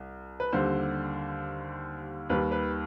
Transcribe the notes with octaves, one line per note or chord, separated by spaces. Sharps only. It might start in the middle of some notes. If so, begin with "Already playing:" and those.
Already playing: C2
B4
D#2 D3 G3 C5
D#2 D#3 G3 B4
B4